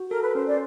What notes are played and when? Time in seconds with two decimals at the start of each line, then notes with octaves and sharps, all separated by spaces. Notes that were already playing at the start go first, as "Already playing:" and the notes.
Already playing: F#4
0.11 A4 A#4
0.23 B4
0.35 C#4 C5
0.47 C5 D5